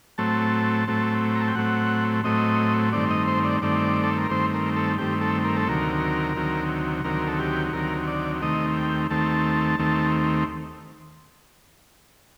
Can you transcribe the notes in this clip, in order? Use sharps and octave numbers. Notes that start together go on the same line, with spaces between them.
A2 F#3 A3 C4 A5
A2 F#3 A3 C4
A#5
A5
G5
A2 F#3 A3 C4 F#5
A2 F#3 A3 C4 D#5
G2 D#3 A3 C4 D5
D#5
C5
D5
G2 D#3 A3 C4 D5
A4
A#4
G2 D#3 A3 C4 C5
A#4
A4
G2 D#3 A3 C4 G4
A4
A#4
A4
D2 C3 D#3 F#3 A#4
D2 C3 D#3 F#3
D2 C3 D#3 F#3 A#4
A4
G4
D2 C3 D#3 F#3 A#4
D5
D#2 D#3 A3 C4 D#5
G5
D#2 D#3 A3 C4 A5
D#2 D#3 A3 C4